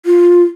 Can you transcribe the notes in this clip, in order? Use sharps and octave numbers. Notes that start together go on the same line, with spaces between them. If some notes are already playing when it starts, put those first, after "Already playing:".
F4